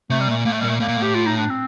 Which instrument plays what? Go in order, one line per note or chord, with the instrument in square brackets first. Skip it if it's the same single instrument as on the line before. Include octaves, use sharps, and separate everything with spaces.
[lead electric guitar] C3 [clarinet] A3
[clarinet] G3
[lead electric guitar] A#2 [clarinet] A3
[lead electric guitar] A2 [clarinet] A#3
[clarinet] A3
[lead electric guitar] A#2 [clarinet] G3
[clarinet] A3
[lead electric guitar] A2 [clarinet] A#3
[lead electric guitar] A#2
A2
[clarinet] G4
F4
D#4
D4
C4